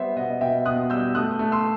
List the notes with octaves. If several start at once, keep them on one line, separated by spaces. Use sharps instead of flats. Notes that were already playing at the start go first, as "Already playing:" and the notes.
Already playing: G3 B3 C5 E5
B2 D#5 F#5
B2 E5 G5
B2 D#6 F#6
G3 E6 G6
A3 D#6 F#6
A3
C6 E6